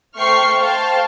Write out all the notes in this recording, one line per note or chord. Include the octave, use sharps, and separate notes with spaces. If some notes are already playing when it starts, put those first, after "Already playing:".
A3 C5 G5 C#6 F6 C7
C5 F5 G5 A5